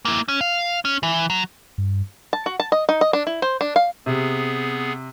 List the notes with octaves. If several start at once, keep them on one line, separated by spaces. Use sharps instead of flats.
A#3 E4
C#4
F5
C#4
E3
F#3
G2
A5
F#4
A5
D#5
D#4
D#5
D4
E4
C5
D4
F5
C3 B3 G#4